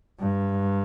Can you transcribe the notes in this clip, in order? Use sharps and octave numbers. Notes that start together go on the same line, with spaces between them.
G2